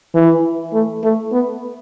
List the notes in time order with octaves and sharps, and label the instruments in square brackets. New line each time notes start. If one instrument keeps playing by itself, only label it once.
[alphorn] E3
A3
A3
B3